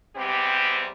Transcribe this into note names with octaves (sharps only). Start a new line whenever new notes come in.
G#2 C3 G3 B3 C4 G4